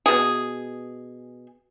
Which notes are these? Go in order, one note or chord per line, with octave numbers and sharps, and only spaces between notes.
B2 G#4